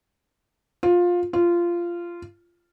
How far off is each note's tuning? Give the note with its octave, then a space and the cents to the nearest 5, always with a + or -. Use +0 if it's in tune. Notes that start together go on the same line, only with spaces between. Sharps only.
F4 +15
F4 -15